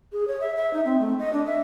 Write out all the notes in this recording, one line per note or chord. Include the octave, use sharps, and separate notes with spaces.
G#4
C#5
E5
E5
D#4
C4
A3
D#5
D4
E5